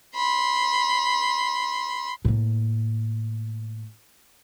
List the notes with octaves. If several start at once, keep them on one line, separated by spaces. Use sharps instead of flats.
B5 C6
A2 A#3